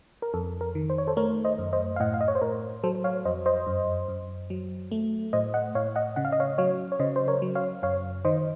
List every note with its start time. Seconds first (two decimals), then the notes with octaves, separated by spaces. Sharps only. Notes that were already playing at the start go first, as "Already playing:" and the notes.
0.22 A#4
0.34 F2 A4
0.61 A#4
0.75 D#3
0.90 C5
0.98 C#5
1.07 A4 C5
1.17 A3 A#4 C#5
1.45 C5 D#5
1.58 F#2
1.73 C5 D#5
1.96 F5
2.00 A2 D#5 F#5
2.14 F5
2.21 D#5
2.28 C#5
2.35 C5
2.42 A2 A#4
2.83 F#3 A4 C5
3.04 C#5 F5
3.25 F2 C5 D#5
3.46 C5 D#5
3.67 F#2
4.08 F#2
4.50 F#3
4.91 A3
5.33 A2 C5 D#5
5.54 D#5 F#5
5.75 A2 C#5 F5
5.96 D#5 F#5
6.16 C#3 F#5
6.25 F5
6.32 D#5
6.40 C#5 F5
6.58 F#3 C#5 F5
6.92 C#5
6.99 C#3 C5 D#5
7.16 C5
7.28 A#4 C#5
7.42 F#3
7.55 C#5 F5
7.83 F#2 C#5 F5
8.25 D#3 C5 D#5